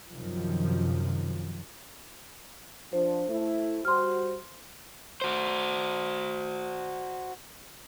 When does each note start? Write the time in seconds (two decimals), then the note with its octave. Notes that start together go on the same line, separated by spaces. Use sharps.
0.12 F#2 C3 D#3 F3
2.93 F3 D4 C5
3.29 A3 E4
3.85 G3 F#4 C5 C6 F6
5.22 F#4 C5